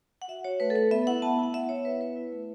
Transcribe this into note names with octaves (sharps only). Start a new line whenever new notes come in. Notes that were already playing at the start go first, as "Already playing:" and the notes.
F#5
F#4 E5
F#4 C#5
A3 B4
A4
A3 B4
B3 E5
E4 F#5
B3 A5
E4 F#5
B3 E5
E4 C#5
B3 B4
E4 B4
E4
A3